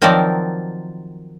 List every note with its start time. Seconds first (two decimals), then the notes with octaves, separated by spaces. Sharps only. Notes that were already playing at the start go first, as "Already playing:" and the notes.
0.02 D#3 F3 F#3 C4 A#4 D5